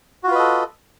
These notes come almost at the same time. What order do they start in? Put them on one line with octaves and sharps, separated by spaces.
F#4 F4 B4 D#5 A4